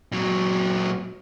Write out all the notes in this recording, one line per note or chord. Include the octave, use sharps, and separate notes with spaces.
A#2 F#3